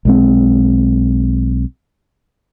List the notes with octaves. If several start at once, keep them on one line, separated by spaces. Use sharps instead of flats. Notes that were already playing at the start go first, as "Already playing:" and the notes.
B1 G#3 C4